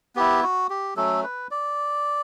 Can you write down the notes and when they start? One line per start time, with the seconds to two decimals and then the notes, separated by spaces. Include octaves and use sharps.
0.16 B3 E4 G4
0.43 F#4
0.70 G4
0.96 F#3 A3 C#4 A4
1.23 B4
1.51 D5